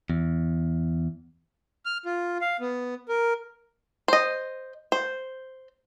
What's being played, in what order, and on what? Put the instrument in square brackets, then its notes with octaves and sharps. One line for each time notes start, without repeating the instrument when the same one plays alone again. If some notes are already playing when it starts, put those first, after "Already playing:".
[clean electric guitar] E2
[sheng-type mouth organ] F6
F4
F5
B3
A#4
[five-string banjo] C5 D#5
C5